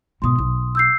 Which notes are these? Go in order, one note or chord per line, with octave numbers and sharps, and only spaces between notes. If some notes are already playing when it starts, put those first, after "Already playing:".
G#2 B2 C6 D#6
B1
E6 G6 C7